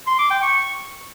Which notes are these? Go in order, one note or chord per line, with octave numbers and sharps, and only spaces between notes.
C6
D6
G5
C#6